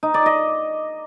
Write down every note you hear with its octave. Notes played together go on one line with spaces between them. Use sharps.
D#4
D5
D#5